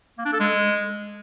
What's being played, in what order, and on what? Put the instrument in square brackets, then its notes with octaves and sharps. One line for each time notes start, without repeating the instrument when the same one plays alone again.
[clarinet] A#3
D4
A4
G#3